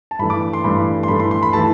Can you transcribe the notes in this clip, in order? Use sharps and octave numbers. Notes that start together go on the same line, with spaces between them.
A5
G2 E3 A3 B5
D6
C6
G2 E3 A3 B5
C6
G2 E3 A3 B5
C6
C6
B5
E3 A3 A5